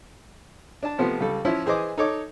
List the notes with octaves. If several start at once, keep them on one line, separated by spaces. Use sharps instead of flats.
D4 A5
C3 F3 A3 B3
C#2 G3 A4
F3 C#4 E4
E3 G#4 C5 D#5 D6
D#4 A4 C#5 D6